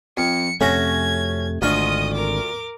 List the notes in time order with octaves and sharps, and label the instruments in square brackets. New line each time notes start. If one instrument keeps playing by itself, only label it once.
[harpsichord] F2 [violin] C#7
[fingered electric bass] F2 C3 A3 [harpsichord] C#4 F#4 A#5 [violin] G#6
[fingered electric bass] G#1 D3 D4 [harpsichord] D2 F4 C#6 [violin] D#5 D#6
[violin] A#4 D6